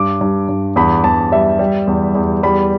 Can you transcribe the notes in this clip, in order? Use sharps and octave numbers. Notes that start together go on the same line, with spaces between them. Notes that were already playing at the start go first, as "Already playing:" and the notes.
Already playing: G2 D6
G2
G2
E2 B5
E2 A5
G3 E5
G3
E2
E2
G3 B5